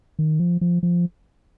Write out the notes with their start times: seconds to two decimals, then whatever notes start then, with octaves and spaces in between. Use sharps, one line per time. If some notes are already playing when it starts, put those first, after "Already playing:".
0.19 D#3
0.39 F3
0.61 F3
0.83 F3